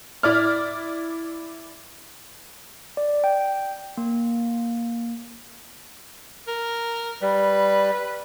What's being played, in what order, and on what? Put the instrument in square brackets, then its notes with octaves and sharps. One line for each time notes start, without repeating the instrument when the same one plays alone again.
[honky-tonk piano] E4 D5 F6
[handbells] D5
G5
A#3
[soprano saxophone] A#4
[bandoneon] G3 [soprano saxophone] B4